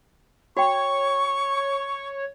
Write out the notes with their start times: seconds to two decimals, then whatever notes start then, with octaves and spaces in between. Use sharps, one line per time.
0.57 F#4 C#5 G5 C#6